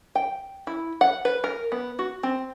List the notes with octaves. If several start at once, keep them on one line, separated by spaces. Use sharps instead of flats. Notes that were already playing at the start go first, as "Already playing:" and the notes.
G5
E4
F#5
B4
A#4
B3
F#4
C4